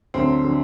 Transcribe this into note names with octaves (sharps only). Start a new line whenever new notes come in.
D2 D3 F#3 C4
D3 F#3